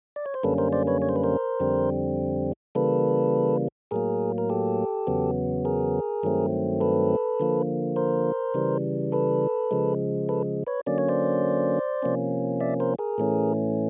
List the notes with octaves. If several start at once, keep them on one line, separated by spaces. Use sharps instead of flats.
D5
C#5
C5
F#2 D3 G3 A#3 C#4 A4 B4
A#4 C5
C5 D5
B4 C#5
C#5
C5
B4
A#4 C5
F2 D3 G3 C4
C#3 E3 G3 A#3 A4 B4
A2 F#3 A#3 G#4 A#4
A#4
G4 A4
E2 C#3 F#3 B3
G#4 A#4
G2 D#3 F#3 A3 C4
A4 B4
D3 F3 A#3
A#4 C5
C#3 E3 G3
A4 B4
C#3 F3 G#3
A4 B4
B4 C#5
D3 F#3 A#3 C#4 D5
C#5
C5 D5
C3 F3 A#3 C#4
D5 E5
A#4 C5
G#4 A#4
A2 E3 A3 C#4